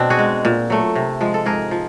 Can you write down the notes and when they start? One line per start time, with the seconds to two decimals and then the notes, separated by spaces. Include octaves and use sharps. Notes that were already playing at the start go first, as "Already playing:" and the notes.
Already playing: B2 C4 D4
0.10 F#4 G#4
0.19 G#3
0.45 A#2
0.70 F#3 A3
0.95 C3
1.21 F3 G#3
1.34 A4
1.46 G#2 G#4 A#4
1.71 F3